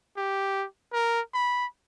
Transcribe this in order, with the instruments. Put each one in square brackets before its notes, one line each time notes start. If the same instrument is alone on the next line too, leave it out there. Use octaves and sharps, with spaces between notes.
[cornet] G4
A#4
B5